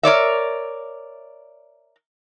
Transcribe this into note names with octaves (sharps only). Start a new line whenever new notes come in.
A#4 C#5 D5 E5